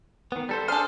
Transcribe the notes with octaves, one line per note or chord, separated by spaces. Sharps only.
D#3 B3
G3 A4 C5
D4 G#4 A4 C5 F6